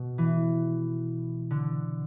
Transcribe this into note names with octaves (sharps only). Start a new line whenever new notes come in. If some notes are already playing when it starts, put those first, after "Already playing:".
Already playing: B2
E3
D3